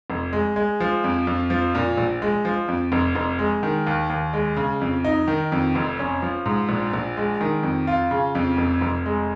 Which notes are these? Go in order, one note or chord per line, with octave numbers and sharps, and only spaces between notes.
F1
G#3
G#3
F3
F2
F2
F3
A#2
A#1
G#3
F3
F2
F1
F1
G#3
D#3
D#2
D#2
G#3
C#3
F2
D#4
D#3
F2
F1
C#4
F3
G#2
A#1
A#1
G#3
D#3
F2
F4
C#3
F2
F1
F1
G#3